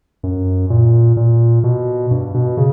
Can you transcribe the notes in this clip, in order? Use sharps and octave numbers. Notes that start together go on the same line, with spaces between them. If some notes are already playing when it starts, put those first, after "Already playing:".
F#2
A#2
A#2
B2
G2
B2
C#3